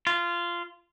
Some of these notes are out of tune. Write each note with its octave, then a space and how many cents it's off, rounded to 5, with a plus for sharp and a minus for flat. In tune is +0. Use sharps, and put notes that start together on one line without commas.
F4 -15